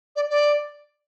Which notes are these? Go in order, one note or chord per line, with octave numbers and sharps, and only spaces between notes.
D5
D5